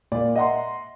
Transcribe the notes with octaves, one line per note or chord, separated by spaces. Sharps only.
A#2 D5
D#5 E5 F#5 A#5 C6